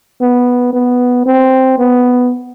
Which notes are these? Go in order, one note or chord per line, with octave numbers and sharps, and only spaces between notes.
B3
B3
C4
B3